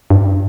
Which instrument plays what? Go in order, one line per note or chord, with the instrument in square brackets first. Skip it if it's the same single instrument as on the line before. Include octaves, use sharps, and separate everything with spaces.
[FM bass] G2